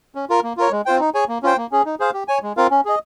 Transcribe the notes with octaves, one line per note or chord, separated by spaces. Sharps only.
C#4
F4 A#4
A#3
F4 A#4 C#5
G#3
C4 F4 C5 G5
D#4
G#4 C#5 G#5
A#3
C#4 F4 C5 G5
A#3
C#4 G#4
D#4
G#4 C5 F5
G4
C#5 G#5
G#3
C4 F4 A#4 F5
C#4
G#4 D#5